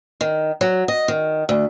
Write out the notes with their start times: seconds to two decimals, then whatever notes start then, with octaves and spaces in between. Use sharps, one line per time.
0.21 D#3
0.61 F#3
0.88 D#5
1.08 D#3
1.49 D2